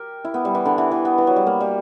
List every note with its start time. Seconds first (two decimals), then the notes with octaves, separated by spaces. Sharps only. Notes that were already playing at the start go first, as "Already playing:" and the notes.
Already playing: G4 A#4
0.25 E4
0.34 B3
0.45 G3
0.55 E3
0.65 D3
0.78 E3
0.91 E3
1.05 B3
1.18 E3
1.27 F#3
1.36 G3
1.47 A#3
1.60 G3